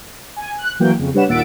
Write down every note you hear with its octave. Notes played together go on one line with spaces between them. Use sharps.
G#5
F#6
E3 F#3 A#3 G5
F2 C#3
G3 D4 B4 C#5 F#5 E7
D#2 A#2 E5 F#5 A6 D7